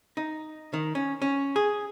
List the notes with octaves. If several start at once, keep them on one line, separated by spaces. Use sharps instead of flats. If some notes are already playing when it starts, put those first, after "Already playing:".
D#4
D#3
C#4
C#4
G#4